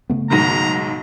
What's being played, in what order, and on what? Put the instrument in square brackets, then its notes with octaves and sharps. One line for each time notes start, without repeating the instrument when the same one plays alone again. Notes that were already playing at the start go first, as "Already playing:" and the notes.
[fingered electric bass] C#3 A3 B3
[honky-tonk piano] B1 G#2 D#3 [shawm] A#5